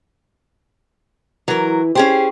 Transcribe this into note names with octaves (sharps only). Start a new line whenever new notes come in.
E3 F#3 A#4
C#4 G4 G#4 C5